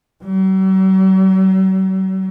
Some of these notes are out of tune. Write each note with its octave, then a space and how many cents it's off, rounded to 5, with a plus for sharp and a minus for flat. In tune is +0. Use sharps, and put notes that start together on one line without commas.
F#3 +45